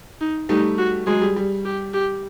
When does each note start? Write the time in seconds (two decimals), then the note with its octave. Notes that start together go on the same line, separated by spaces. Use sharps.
0.21 D#4
0.49 G3 A3 D#4
0.78 F#4
1.06 F#3 G#3 G#4
1.22 G3
1.36 G3
1.65 G4
1.94 G4